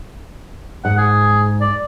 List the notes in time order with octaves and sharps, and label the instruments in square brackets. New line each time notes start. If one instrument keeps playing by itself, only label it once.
[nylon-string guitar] G#2 [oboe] F#5
[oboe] G#4
D5